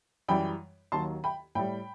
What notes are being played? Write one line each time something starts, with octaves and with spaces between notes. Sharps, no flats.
F#2 E3 G3 G5 B5
D#2 D#3 F#3 A5 C6
G5 B5
A2 G3 G5 B5